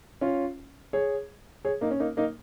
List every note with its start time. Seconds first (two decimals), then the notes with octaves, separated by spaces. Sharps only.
0.21 C#4 F4
0.93 G#4 C#5
1.65 G#4 C#5
1.81 A#3 D#4
1.91 C#4
2.00 A#3 D#4
2.17 A#3 D#4